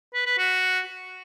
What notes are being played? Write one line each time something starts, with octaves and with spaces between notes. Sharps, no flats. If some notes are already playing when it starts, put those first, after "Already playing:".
B4
B4
F#4